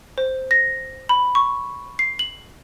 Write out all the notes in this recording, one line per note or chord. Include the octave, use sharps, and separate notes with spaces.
C5
A#6
B5
C#6
C7
F#7